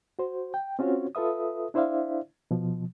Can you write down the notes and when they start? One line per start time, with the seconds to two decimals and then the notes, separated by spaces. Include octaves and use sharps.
0.19 F#4 C5
0.54 G5
0.79 C4 C#4 F4 F#4 C5 C#5
1.15 F4 A4 B4 E5 D#6
1.74 D4 E4 C5 D5 E5 F5
2.51 B2 F3